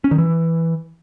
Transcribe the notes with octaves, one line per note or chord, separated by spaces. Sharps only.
C#4
D#3
E3